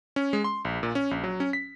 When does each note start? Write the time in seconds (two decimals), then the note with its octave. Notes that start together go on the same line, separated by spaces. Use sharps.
0.16 C#4
0.33 G#3
0.44 C6
0.65 A#1
0.83 A#2
0.95 C#4
1.11 A#1
1.24 F#3
1.40 C#4
1.53 B6